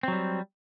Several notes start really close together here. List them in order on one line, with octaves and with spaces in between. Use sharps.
C4 F#3 G3